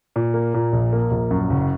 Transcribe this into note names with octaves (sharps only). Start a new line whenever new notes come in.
A#2
A#3
A#2
A#1
A#3
A#1
F#2
F#1